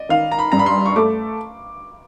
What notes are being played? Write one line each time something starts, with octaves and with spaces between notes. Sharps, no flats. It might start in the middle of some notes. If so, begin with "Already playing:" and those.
Already playing: D5 D#5
D#3 F5
A#5
B5
G2 A#5
B5
C6
C#6
A3 D6